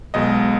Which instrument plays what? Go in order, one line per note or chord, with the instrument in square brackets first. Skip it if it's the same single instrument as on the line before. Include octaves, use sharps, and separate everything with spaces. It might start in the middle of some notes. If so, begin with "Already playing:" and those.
[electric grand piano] B1 B2 G#3 D#5